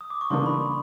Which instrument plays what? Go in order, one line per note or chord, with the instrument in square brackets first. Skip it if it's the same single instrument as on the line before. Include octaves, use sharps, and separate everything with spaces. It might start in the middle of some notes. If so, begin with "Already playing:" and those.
[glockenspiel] D#6
D6
C#6
[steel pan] C#3 E3 G3 A#3 D4 [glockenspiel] C6
[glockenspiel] B5